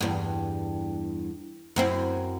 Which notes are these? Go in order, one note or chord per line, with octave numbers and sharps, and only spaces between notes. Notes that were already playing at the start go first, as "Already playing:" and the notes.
E2 G2
F#2 C4 E4